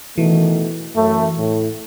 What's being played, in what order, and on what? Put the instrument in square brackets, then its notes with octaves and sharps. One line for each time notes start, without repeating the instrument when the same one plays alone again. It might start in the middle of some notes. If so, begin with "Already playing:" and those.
[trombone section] B2 D#3 A3 [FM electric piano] E3
[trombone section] F#2 A3
A2